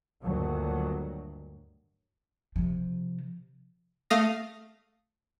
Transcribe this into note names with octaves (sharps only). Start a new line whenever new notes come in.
D2 G2 A#2 D#3 F#3
C3 F3
A3 F5 D#6 A#6